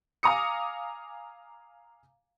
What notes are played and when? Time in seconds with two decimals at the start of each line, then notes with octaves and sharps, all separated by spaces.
0.23 F5 G#5 A#5 D6 D#6 C#7